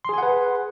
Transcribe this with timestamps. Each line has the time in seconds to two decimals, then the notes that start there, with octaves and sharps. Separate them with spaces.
0.05 C6
0.09 G#4
0.14 G#5
0.18 F#5
0.23 B4